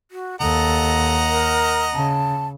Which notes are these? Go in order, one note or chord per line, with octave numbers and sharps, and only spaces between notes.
F#4
D#2 A4 D#5 F#5 A#5
A#4
C#3 A5